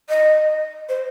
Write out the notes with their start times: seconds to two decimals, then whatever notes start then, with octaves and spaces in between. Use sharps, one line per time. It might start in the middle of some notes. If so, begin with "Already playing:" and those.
0.09 D#5
0.89 C5